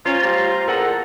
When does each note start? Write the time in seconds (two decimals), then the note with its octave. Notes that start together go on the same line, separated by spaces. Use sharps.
0.06 C#4 F4 C5 A#5
0.22 G3 A3
0.68 E2 A#2 A4 A#4 F#5 A#5